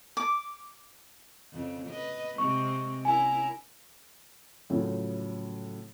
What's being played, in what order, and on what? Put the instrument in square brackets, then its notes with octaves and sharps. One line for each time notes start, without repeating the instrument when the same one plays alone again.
[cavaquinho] D6
[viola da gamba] F2 C#3
B4 D#5
[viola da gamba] C3 G#3 C4 [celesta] C#6
[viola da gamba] C#4 E4 A#4 [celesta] G#5
[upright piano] A2 C#3 F3 F#3